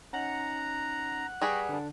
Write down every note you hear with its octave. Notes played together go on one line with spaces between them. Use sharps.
C#4 D#4 F#5 A#5
G3 G#4 B4 G5 C#6 A#6
D3 D4